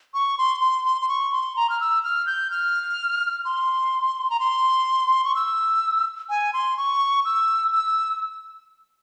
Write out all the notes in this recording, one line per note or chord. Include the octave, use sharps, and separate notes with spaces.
C#6
C6
C6
C6
C6
C#6
C6
A#5
F6
E6
F6
G6
F6
C6
A#5
C6
C#6
E6
G#5
C6
C#6
E6
E6